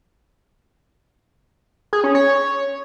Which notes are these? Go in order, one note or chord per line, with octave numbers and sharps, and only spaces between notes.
G#4
C#4
C#5